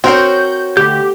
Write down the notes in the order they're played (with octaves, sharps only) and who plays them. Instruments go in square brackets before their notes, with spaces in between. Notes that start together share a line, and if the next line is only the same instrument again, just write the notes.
[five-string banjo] C4 A#4 C5 [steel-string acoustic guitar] F#4 C#5 [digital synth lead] G6
[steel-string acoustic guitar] D2 [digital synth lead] G4 [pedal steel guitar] G6